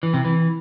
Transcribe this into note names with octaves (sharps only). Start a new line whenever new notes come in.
E3
C3
E3